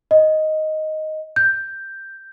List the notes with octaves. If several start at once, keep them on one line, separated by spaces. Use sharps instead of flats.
D#5
G6